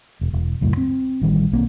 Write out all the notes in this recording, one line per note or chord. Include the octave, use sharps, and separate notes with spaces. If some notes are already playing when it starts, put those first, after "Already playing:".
E1
E1
C#2 F#2 A2
C4
A1 D#3 G3
B1 A#3 C4